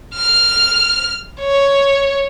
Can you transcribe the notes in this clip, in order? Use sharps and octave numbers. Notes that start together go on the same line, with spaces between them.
F6
C#5